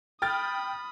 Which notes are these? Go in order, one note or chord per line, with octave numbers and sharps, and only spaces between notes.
G5 B5 D#6 F6 A6